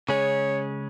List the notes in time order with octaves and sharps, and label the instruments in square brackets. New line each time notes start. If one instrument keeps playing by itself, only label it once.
[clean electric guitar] C#3 G#3 C#4 G#4 [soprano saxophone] C#5